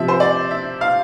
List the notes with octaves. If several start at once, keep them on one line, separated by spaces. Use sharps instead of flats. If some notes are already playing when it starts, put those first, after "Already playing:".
Already playing: C3 F3 E5
C5
D5
E5
F5